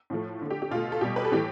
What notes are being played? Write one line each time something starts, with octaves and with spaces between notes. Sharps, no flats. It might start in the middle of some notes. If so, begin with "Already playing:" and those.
A2 F3 A3
D3 A3
G4
G4
B2 A3 F4
A4
B2 G3 G4
B4
A4
A2 E3 A3 G4